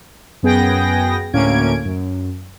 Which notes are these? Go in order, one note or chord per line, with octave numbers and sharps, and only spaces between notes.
F#2 B3 G#4 G5 A#6
D2 A2 A#3 C#4 G#6 D7
F#2